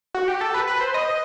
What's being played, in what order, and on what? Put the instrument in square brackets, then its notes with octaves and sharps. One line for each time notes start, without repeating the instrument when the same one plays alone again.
[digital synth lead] F#4
G4
A4
B4
B4
C5
D#5